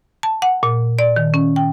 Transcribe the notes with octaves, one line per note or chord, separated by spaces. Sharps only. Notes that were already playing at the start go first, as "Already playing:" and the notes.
A5
F#5
A#2
D5
D#3
C#4
G5